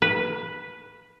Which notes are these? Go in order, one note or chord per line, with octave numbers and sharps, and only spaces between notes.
B4